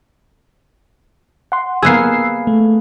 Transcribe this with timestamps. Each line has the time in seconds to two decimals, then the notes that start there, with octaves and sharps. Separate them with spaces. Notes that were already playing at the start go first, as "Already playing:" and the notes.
1.52 F#5 C6
1.82 A#3 B3 G#4 E6 C7
2.47 A3